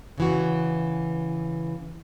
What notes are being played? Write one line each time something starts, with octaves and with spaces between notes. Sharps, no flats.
C#3 E3 F#4